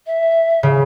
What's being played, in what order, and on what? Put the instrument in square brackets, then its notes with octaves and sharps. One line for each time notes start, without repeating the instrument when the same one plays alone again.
[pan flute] E5
[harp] C#3